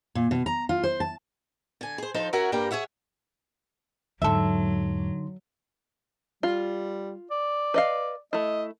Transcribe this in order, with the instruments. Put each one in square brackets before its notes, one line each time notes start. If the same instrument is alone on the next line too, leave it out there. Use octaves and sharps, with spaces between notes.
[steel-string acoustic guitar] A#2
B2
A#5
F4
C5
A5
D3 G#5
G#4 C5
F3 D#4 A4 C5
C#4 F#4 A#4 E5 F#5 G#5
G2 G3 A#3 G5 A#5
G#4 C#5 E5 F#5
[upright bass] E2 G#2 [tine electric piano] D3 D#4 C6 [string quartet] F#3 [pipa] A4 E5
[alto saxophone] G3 [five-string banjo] F4
[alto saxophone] D5
[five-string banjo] B4 D#5 F5
[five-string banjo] A3 E4 [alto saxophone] D#5